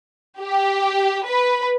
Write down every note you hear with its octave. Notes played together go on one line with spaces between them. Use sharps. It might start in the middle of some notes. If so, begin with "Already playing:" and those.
G4
B4